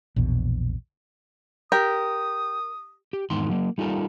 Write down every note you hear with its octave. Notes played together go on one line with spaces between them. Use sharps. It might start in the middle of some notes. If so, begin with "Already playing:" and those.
A#1 E2 B2
G4 A#4 D#6
G4
E2 G#2 D#3 C6
F#3 A#3
G3 D#4 F4 A4 A#4